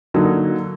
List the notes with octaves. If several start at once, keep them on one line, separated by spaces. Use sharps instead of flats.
D3 F#3 A#3 D#4